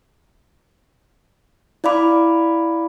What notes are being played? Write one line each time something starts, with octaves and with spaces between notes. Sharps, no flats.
E4 D5 F5 B5 D6